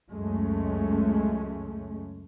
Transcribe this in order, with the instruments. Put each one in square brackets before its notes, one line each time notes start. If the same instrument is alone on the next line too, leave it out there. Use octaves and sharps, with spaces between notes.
[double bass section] C#2 F#2 G#3 A3 C#4